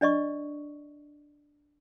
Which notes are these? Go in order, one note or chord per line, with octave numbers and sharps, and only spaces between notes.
D4 D5 D#5 C#6